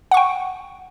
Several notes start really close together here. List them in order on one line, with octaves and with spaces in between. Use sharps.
F#5 C#6 G5